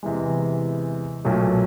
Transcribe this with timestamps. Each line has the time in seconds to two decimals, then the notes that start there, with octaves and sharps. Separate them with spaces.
0.03 E2 C3 E3 G#3
1.25 B1 A#2 F#3 A3